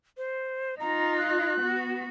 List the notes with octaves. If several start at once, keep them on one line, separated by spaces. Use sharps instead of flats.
C5
D#4 F4 A#5
F#6
B3 F#4